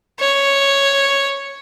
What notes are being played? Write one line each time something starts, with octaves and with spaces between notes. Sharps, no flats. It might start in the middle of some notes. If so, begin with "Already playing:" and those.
C#5